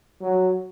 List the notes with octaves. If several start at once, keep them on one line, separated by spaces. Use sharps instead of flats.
F#3